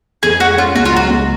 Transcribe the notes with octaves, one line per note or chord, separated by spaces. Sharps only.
F2 G#4
G#3 F#4
C#4 F4
C#2 F#4
F4
F#3 F#4
C#2